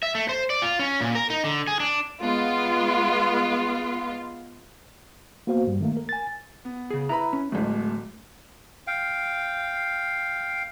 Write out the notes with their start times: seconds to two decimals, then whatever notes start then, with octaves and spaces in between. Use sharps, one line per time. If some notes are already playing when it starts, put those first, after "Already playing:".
0.03 E5
0.15 A3
0.29 C5
0.50 D5
0.62 F4
0.79 C#4
1.01 A#2
1.15 A#4
1.30 D#4
1.44 D3
1.68 G#4
1.80 D4
2.21 G#3 B3 F4
5.47 A#3 B3 F#4 C5 F5
5.67 G2 G3
5.81 D#3 A3 A#3
5.97 A#4
6.09 G#5 A6
6.65 B3
6.90 C#3 G#4
7.09 E4 B4 A#5 B5
7.33 C#4
7.52 D1 A1 G#3 A3
8.87 F5 G5